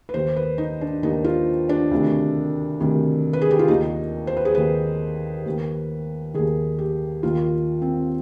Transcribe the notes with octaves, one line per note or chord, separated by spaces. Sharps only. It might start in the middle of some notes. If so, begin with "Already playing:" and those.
B4
D#2 D#3 C5
B4
D#4
D4
D#2 D#3 D#4
F4
D4
D2 C3 D#3
D2 C3 D#3
B4
G#4
G4
F4
D#2 D#3 D#4
C5
B4
G#4
D#2 D#3 B4
D#2 D#3
D#2 D#3 G#4
G4
D#2 D#3 F4
C4